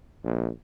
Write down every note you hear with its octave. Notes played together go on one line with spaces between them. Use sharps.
A#1